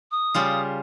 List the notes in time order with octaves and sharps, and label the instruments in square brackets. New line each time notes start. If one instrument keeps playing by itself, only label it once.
[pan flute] D#6
[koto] C#3 G3 F4